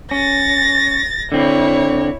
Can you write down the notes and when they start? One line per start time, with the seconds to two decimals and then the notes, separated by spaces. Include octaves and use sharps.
0.11 C#4 A6 A#6
1.32 D3 C4 E4 C#5